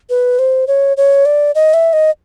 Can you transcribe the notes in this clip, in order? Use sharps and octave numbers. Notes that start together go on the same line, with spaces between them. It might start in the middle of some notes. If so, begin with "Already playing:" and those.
B4
C5
C#5
C#5
D5
D#5
E5
D#5